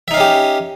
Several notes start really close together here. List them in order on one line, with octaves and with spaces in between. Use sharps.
E5 D#4 F5 C#4 G4